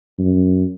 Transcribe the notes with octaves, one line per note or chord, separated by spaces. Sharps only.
F#2